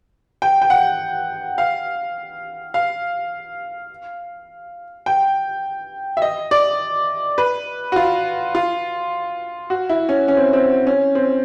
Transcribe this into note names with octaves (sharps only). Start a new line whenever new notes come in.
G5
G5
F#5
F5
F5
G5
E5
D#5
D5
B4
F#4
F4
F4
F#4
E4
C#4
C#4
C4
C4
C#4
C4